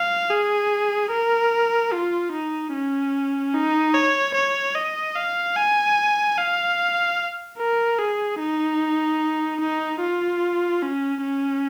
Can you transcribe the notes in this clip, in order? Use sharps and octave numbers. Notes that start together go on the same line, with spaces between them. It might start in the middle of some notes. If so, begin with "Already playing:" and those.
Already playing: F5
G#4
A#4
F4
D#4
C#4
D#4
C#5
C#5
D#5
F5
G#5
F5
A#4
G#4
D#4
D#4
F4
C#4
C#4